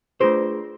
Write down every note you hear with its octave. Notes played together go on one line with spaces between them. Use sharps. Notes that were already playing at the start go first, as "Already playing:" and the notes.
A3 D4 F4 G#4 B4 C5